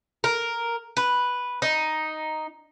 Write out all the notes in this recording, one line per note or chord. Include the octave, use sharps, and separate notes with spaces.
A#4
B4
D#4